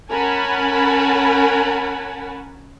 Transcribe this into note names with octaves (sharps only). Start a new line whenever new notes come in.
C#4 A#4 F#5 G#5 A5 B5